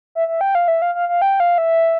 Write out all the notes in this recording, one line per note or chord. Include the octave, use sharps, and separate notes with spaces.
E5
E5
G5
F5
E5
F5
F5
F5
G5
F5
E5